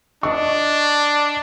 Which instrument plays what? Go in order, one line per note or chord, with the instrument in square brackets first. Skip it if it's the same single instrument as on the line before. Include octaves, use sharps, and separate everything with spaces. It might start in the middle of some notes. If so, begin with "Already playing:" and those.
[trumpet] D4 [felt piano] D#5 C#6